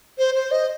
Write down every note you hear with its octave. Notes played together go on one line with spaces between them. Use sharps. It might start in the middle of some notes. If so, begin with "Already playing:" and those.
C5
C5
D#5